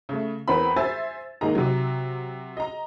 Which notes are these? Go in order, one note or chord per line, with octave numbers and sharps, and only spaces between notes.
C#3 A3
E2 B3 C4 A#4 B5
C5 E5 G#5 E6 A6
G#1 G#2 A#3 G#4 D#5 A#5
C3 F#3
D#5 A#5